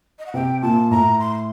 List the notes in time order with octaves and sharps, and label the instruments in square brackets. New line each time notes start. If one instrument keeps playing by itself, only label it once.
[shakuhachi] D#5
F#5
[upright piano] C3 [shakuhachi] G5
[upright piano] A#2 [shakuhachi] A5
[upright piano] A2 [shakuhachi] A#5
[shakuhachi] C6